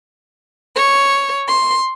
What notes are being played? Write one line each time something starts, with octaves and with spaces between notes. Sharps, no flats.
C#5
C6